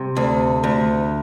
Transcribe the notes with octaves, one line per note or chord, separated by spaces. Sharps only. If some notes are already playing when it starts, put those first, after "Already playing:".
Already playing: C3 G3
D2
D2